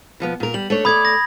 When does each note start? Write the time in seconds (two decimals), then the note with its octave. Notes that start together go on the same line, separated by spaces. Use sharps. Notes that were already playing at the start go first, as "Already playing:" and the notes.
0.20 B2 F3 B3
0.40 A#2 A#4
0.54 G3 F#7
0.70 A3 D4 C#5
0.85 A3 C5 D5 B5 D#6 G#6
1.05 A#6